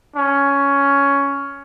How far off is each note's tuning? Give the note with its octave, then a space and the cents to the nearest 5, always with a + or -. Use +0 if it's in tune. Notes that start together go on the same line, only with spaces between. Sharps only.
C#4 +10